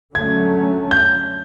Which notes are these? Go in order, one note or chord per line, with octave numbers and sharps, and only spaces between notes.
D3 F#3 A3 C#4 G#6
G6